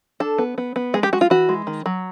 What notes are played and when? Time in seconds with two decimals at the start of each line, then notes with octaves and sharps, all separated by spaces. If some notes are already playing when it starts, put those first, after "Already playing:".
0.20 D4 A4
0.38 B3
0.58 B3
0.76 B3
0.94 G#3 G#4
1.03 G4
1.13 G#3 F#4
1.21 F4
1.30 E3 F#4
1.49 G#3
1.67 D#3
1.86 F#3